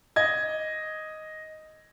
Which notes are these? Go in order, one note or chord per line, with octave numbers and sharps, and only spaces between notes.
D#5 G#6